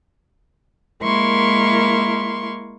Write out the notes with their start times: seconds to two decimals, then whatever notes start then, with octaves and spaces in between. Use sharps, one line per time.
1.03 G#3 A#3 E4 A#4 C6 C#6